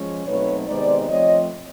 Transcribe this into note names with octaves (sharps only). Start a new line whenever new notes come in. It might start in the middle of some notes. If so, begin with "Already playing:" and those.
Already playing: F3 G#3 C#4
B2 F#3 A3 C4 D#4 B4 C#5
C3 D#3 G#3 B3 D#4 C5 D5
F3 A3 C4 C#5 D#5